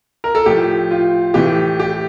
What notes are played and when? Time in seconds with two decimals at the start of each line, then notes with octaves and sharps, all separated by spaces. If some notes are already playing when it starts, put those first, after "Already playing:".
0.24 A#4
0.35 A4
0.46 A2 F3 G4
0.91 F4
1.34 A2 E3 G4
1.80 G4